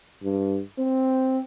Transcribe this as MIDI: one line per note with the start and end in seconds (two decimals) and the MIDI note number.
0.23 0.60 43
0.78 1.41 60